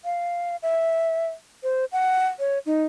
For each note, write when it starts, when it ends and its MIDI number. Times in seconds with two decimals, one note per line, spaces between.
0.05 0.56 77
0.63 1.27 76
1.63 1.85 72
1.92 2.27 78
2.39 2.59 73
2.66 2.85 63